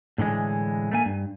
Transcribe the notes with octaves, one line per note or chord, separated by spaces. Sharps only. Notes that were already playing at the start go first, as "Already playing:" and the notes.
A2 D3 E3 G#3
A3 A#3 G#5
G2